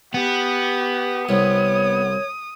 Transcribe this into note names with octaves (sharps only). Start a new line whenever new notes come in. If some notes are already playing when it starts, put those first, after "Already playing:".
B3 G4
C2 C#5 D#6